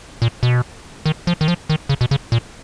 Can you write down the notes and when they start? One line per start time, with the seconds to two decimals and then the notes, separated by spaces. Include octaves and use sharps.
0.22 A#2
0.43 B2
1.06 D#3
1.27 F3
1.41 D#3
1.48 F3
1.70 D#3
1.89 C#3
2.01 B2
2.11 C#3
2.32 A#2